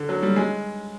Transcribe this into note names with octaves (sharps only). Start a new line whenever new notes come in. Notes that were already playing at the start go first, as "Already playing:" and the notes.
Already playing: D3
F#3
G3
G#3